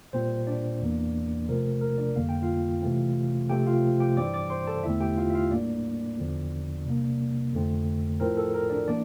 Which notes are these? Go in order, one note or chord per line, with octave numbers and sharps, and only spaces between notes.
A#2 G3 C4 C5
D4 D5
E2 E3 A#3
C3 F3 A3 C4 A#4
A#4
D4 D5
F2 D3 G3 A#3 F5
G5
F4 F5
C3 E3 A3 C4
C3 F3 A3 C4 G4 G5
F4 F5
G4 G5
G2 E3 G3 C4 D5 D6
D5 D6
C5 C6
A4 A5
E2 D3 A3 C4 E4 E5
G4 G5
F4 F5
E5
F4 F5
A2 G3 A#3 D4 D5
E2 D3 F3 C4
C3 G3 A#3
F2 D3 A3 C4
A2 F3 C4 A#4
A4
A#4
D4 D5
E3 A#3 D4 D5